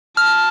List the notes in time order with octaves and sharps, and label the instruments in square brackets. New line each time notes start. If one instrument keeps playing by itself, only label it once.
[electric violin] A5 [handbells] F6